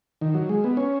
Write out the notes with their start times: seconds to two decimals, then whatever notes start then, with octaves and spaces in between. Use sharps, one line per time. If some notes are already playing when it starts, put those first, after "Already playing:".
0.21 D#3
0.34 F#3
0.49 G#3
0.64 B3
0.77 C#4